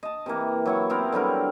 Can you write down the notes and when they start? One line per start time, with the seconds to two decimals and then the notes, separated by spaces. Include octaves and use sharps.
0.03 D#5 A5
0.26 C3 E3 A#3
0.66 F#3 E4 C#6
0.90 B3 C4 E4 A#4
1.12 D3 F#3 G3 A#4